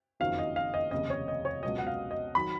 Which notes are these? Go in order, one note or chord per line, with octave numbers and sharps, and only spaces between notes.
F#1 F2 D#3 F#3 F5
D#5
F5
D#5
F1 D#2 C#3 D#5
C#5
D#5
C#5
C#2 B2 F#3 D#5
F#5
F5
D#5
D#3 F#3 B5